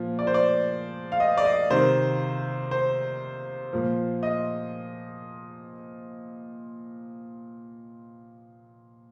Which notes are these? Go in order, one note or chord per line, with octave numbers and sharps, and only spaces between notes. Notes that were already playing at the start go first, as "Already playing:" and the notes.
Already playing: A#2 F3
D5
C5
D5
F5
D#5
D5
D#5
C3 D#3 C5
C5
A#2 F3
D#5